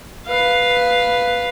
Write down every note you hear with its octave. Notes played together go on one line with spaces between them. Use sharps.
B4 F5